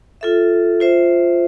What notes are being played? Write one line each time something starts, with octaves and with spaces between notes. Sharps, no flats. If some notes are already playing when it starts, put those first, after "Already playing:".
F4 A4 E5
F4 C5 E5